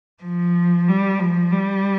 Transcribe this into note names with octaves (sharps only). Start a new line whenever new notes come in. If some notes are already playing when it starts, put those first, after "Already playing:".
F3
G3
F3
G3